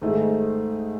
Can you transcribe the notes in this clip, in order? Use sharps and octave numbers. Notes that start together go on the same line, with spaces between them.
G#2 D#3 A3 D#4 G#4